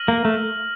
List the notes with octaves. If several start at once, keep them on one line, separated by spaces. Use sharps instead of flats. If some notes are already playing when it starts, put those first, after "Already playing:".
Already playing: F6 A#6 D#7 F#7
A#3
A3